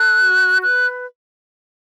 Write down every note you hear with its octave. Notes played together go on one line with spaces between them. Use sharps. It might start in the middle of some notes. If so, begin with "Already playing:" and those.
Already playing: A4 F#6
F#4
B4 F#6